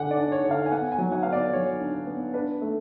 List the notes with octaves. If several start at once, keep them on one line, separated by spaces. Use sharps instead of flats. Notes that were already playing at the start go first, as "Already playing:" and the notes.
Already playing: D3 D4 F#5 G#5
D5
D4
C#5
D3
F5
G#5
B3 F#5
G#5
F#3
F#5
B3 F5
D5
F#3 C#5
D4
B3
D4 B4
A3